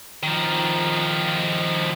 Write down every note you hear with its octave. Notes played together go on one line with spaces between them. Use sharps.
D#3 F3